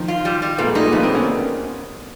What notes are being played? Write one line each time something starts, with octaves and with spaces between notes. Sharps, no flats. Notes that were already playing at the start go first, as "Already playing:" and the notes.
Already playing: D#3 F3
F4
G3
G3
A#2 A3 B3
G#3 A#3
G3 A3 D#4
G#3 A#3
F2 A3 B3
A#3 C4
B3 C#4